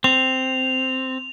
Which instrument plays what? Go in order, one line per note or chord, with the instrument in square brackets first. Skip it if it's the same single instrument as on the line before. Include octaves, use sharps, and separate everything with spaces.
[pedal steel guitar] C4 [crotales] F7